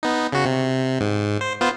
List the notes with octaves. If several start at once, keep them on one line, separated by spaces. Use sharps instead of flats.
B3 D#4
C#3 F#4
C3
G#2
C5
B3 F4 C5